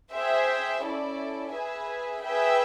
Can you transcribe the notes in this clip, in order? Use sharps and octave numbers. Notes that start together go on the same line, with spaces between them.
G#4 C5 E5 G5
C#4 E4 A4 D5
G#4 B4 E5 G#5
G#4 B4 E5 G5